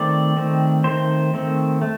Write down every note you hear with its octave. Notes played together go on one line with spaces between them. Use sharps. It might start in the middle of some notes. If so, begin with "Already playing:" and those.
Already playing: D#3 A3 C4 D5
D#3 A3 C4
D#3 A3 C4 C5
D#3 A3 C4
A3